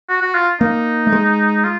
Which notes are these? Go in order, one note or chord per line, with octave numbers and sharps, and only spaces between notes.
F#4
F#4
F4
A#3 D#4
A3
G#3
F4